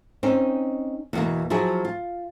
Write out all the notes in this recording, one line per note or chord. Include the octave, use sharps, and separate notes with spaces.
C4 C#4 D#4
E2 B2 A#3
F3 F#3 E4 F#4 G#4
F4